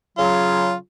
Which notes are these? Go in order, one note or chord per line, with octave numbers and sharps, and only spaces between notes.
C#3 F#3 F4